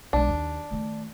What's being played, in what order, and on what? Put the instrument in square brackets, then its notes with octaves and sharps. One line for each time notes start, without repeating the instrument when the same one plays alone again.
[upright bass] B1 G#3 [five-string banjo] D4
[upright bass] D#2
D#3 A3